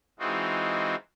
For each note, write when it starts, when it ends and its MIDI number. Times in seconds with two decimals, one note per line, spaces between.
0.19 0.95 52
0.19 0.95 56
0.19 0.95 60
0.19 0.95 63
0.19 0.95 65
0.19 0.95 66